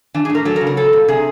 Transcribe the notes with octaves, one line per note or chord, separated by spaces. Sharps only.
E3 D4
G#4
A2
A#4
F#3 A4
A#4
C#3
A#4
F#3 A4
A#2
C3 G#4